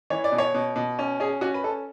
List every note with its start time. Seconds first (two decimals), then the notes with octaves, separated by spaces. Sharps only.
0.10 E3 C#5
0.24 D5
0.32 B2
0.38 C#5
0.54 B2
0.76 B2
0.99 C#4
1.20 C#4 G#4
1.41 C#4 F#4
1.54 B4
1.64 C#4 A4